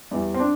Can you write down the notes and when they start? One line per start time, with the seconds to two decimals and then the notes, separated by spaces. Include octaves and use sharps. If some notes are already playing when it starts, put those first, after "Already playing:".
0.11 E2 E3 G3
0.34 C4
0.40 D4